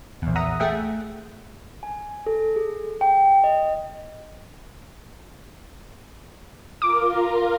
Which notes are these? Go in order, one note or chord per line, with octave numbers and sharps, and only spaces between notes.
A#1 E2
E5 F#5 A#5 D#6
A3 G#4 E5 F#5 G5
G#5
A4
G#4
G5
D#5
F4 A#4 D6